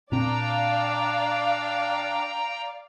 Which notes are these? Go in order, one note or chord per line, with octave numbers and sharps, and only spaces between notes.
A#2 C4 D4 D5 F5 G5 A#5